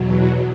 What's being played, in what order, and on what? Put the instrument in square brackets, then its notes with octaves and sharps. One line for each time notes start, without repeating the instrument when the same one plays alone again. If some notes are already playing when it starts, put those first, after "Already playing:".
Already playing: [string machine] E2 B2 F#3